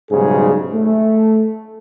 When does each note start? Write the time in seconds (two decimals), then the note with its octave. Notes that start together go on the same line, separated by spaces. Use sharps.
0.11 B1 G#2 C#3 G3 G#4
0.74 A3